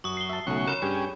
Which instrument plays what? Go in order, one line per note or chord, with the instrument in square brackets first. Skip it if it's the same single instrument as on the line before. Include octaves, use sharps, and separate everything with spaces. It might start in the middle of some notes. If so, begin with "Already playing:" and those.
[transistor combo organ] F#2 [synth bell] C#6 D#6
[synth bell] C7 G7
[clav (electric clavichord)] E5 A5
[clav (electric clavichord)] B1 A3 [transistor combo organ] C#3 F#4 C#6
[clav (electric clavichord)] A#4 [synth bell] C#5 B5
[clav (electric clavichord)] G2 [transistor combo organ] C#4 G4 G#4